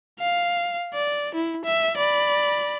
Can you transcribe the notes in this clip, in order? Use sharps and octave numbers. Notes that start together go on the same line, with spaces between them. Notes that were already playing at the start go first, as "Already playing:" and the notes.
F5
D5
E4
E5
D5 B5